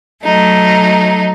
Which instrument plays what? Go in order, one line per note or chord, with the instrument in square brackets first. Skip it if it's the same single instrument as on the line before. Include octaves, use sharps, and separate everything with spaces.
[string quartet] F#3 A3 D#4